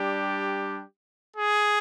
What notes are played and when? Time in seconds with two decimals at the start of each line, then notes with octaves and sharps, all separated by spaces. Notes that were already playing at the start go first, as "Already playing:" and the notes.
Already playing: G3 D4 G4
1.35 G#4